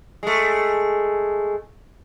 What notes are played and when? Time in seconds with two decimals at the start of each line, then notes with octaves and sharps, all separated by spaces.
0.23 G#3 A3